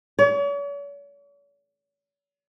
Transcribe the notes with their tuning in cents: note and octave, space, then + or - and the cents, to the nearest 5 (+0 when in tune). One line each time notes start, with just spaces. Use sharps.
C#5 +45